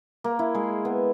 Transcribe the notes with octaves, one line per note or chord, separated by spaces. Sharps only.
A#3
E4
G#3
B3